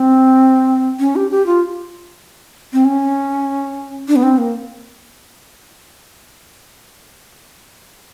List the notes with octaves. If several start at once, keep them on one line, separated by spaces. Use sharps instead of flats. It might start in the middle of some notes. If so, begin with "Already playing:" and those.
Already playing: C4
C#4
G4
G4
F4
C4
C#4
D4
B3
C4
A#3